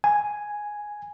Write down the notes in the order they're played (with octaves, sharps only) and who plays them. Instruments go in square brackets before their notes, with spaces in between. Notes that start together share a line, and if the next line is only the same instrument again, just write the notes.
[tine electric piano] G#5